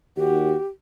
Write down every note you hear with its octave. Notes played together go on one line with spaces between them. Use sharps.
D#2 F#4 G4